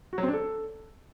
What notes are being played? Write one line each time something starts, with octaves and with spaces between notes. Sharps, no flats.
F#4
F#3
C4
D4
A4